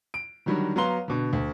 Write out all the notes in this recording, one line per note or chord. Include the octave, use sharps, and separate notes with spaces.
D7
D3 D#3 F#3 G3
F#3 B3 F5 A#5 C6 G7
B2 D3
D2